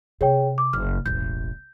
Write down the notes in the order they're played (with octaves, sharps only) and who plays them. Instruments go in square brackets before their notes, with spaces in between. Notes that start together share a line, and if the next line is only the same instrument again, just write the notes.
[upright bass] C3 [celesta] G#4 C#5 G5
[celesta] D6
[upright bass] F#1 [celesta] F6
[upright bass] E1 A1 [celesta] G6